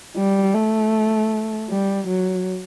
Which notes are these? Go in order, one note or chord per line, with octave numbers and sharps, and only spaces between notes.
G3
A3
G3
F#3